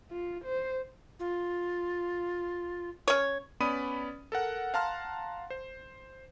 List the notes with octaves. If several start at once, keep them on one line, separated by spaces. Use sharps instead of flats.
F4
C5
F4
C#4 C#5
B3 C#4 D5 B5 D#6 D#7
A4 A#4 F#5
F5 F#5 A5 A#5 C6 F6
C5